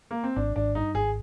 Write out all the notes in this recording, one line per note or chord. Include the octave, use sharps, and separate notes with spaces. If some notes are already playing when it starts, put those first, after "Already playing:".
A#3
C4
G#1 D4
G#1 D4
G2 D#4
G#1 G#4